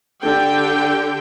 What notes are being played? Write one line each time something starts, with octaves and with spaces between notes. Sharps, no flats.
D3 G4 G5